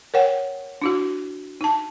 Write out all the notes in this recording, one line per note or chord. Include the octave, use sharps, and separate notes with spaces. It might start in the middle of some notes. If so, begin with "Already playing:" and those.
A#4 C#5 F#5 G5
D4 E4 F#4
D#4 A5